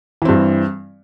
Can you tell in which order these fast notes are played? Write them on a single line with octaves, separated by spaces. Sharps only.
E3 C4 G2